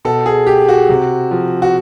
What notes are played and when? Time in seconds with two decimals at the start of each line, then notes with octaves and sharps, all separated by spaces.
0.05 B2 A4
0.26 G#4
0.47 G4
0.68 F#4
0.89 C3
1.31 F3
1.62 F#4